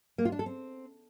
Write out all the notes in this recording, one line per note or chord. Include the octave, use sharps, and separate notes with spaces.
A#3
F4
D4
A4
C4